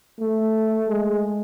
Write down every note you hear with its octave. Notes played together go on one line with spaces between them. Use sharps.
A3
G#3